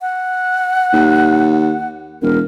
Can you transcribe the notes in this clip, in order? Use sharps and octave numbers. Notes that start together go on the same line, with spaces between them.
F#5
D#2
E1 A#4